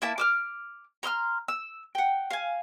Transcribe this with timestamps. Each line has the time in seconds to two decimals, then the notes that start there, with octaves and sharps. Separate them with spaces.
0.02 A#3 E4 A5
0.18 D6 E6 F6
1.03 A#5 C6 E6 F6
1.48 E6
1.95 F#5 G5
2.31 F5 G#5